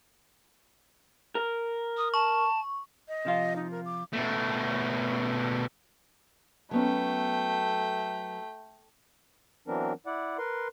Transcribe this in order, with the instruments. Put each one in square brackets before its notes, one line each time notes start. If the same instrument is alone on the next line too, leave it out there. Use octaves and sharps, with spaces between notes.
[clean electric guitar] A#4
[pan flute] D#6
[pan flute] A5 [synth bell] C#6
[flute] D#5
[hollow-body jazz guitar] C3 F3 F4
[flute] D#4
A#4
D6
[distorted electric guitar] B2 A3
[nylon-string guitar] F#3 B3 C#4 [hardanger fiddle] A3 G5
[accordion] E3 F#3 B3 C4 D4 A#4
E4 D5 F#5
A#4 B4 C6